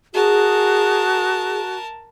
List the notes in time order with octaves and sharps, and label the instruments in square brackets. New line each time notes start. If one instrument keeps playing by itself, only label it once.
[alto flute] F#4 [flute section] G#4 [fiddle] A#4 A5